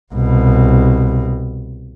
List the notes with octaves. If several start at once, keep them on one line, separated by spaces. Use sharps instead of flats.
C2 B2